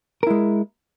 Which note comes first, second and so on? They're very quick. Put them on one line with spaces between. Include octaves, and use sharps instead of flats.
A#4 E4 G#3